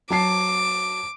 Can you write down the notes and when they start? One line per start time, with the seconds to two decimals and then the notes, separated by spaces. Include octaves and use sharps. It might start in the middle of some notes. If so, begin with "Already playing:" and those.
0.10 F#3 A5 D6 C7